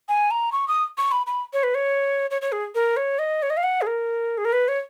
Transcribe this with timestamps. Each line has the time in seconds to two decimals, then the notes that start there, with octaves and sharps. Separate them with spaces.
0.09 G#5
0.31 A#5
0.52 C#6
0.68 D#6
0.98 C#6
1.12 B5
1.27 B5
1.53 C#5
1.63 B4
1.75 C#5
2.31 C#5
2.42 C#5
2.52 G#4
2.75 A#4
2.97 C#5
3.19 D#5
3.43 C#5
3.50 D#5
3.57 F5
3.63 F#5
3.82 G#4
3.87 A#4
4.38 G#4
4.45 A#4
4.53 B4
4.68 C#5